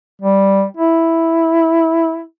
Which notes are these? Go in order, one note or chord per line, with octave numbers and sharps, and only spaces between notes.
G3
E4